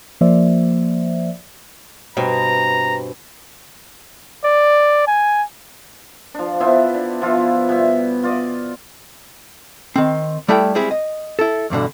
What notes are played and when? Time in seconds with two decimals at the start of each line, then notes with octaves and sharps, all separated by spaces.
0.21 F3 A#3 C5 D5 E5
2.17 G2 B2 C4 A#5
4.44 D5
5.08 G#5
6.34 F3 D4
6.60 B3 E4 C5 E5
6.94 D4
7.21 B2 F3 E4 F4
7.69 B2 G3 E5
8.23 F4 D5 D#5
9.96 D#3 C4
10.48 G3 A3 E4 A4 G5
10.75 G3 G#3 C4 E4 G#4
10.91 D#5
11.39 E4 A4
11.70 E2 G2 B2 D3